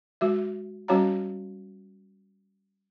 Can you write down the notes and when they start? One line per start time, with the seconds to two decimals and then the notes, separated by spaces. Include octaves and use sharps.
0.21 G#3 F#4 E5
0.88 G3 C#4 F#4 C#5 F5 A#5